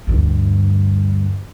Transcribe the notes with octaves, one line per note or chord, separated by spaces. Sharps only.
D2 G2